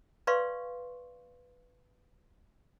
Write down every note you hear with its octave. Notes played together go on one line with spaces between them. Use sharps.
B4 D5 F5 C6 C#6